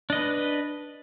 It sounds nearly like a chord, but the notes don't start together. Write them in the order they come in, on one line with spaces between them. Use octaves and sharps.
D4 D#5 B4